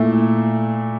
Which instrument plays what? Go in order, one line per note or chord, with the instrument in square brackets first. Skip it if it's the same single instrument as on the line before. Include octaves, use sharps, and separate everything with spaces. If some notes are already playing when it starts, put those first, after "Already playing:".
Already playing: [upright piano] A#2 A3 E4